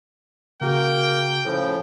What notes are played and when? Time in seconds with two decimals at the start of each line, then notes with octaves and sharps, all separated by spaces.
0.61 C#3 A#3 F#4 G#4 A#4 G5
1.45 A2 C#3 F3 A4